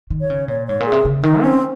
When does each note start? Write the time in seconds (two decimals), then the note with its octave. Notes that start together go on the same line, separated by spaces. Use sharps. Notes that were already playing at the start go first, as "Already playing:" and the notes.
0.10 D#3
0.21 C#5
0.30 C#3
0.48 A#2 C#5
0.67 G#2 C#5
0.80 A#2
0.86 G#4
0.92 C3
1.05 C#3
1.23 D#3 D#4
1.41 C4 C#4